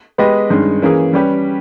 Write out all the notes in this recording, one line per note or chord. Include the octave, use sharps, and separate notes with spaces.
G#3 B3 G4 B4 D#5
G2 D#3 G#3 C#4
E3 A#3 C#4 G#4
G3 C#4 G4 B4